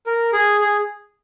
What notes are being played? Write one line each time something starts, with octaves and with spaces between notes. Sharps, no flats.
A#4
G#4
G#4